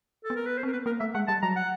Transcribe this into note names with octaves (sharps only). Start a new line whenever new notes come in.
A4
B3
A#4
B4
C5
C4 A#4
B3 B4
A#3 A#4
A3 E5
G#3 F#5
G3 A5
F#3 A#5
F#5